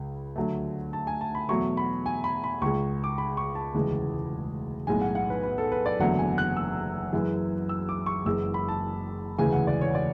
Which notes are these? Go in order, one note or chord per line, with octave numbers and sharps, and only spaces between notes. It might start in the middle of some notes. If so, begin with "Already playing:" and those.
Already playing: C#2 C#3
D2 D3 F#3 A3
A5
G#5
A5
B5
E2 B2 F#3 A3 C#6
B5
G#5
B5
B5
C#2 C#3 G#3 C#6
D6
B5
C#6
A5
E1 D2 C#3 E3 G#3
B1 A2 G#3 G#5
F#5
F#5
B4
B4
A4
B4
D5
F#1 E2 D3 F#3 A3 F#5
G#5
F#6
E6
F#2 E3 G#3
E6
D6
C#6
F#1 F#2 E3 G#3 E6
B5
A5
E1 D2 C#3 E3 G#3 G#5
F#5
D5
C#5
D5